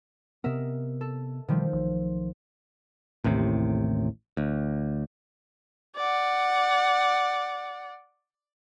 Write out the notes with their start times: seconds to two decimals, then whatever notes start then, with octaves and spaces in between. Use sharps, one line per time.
0.44 C3 B3 A#4 D#5 E5
1.01 A4
1.48 B2 D#3 F3 G3 A3
1.73 B1
3.24 A1 D#2 A2 C3
4.37 D2
5.96 D5 F#5